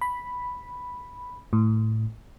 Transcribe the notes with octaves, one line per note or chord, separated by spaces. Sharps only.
B5
A2